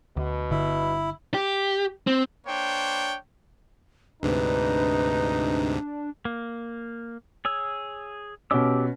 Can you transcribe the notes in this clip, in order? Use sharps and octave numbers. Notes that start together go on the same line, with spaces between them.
D2 B2
G1 D3 E4
G4
C4
A#3 D4 C5 C#5 G5
D2 G#2 C3 D4 D#4 B4
A#3
G#4 C#5 E6
B2 C#4 G4 D6 E6